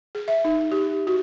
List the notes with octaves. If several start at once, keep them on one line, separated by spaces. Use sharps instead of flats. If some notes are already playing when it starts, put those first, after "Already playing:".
G#4
E5
D#4
G4
F#4